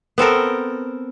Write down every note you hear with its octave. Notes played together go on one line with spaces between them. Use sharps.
B3 C4 A4 A#4